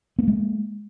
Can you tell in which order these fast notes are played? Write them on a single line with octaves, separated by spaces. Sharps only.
B3 A#3 G#3